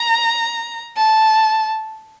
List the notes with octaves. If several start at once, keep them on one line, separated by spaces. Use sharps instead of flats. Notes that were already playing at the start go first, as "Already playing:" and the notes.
Already playing: A#5
A5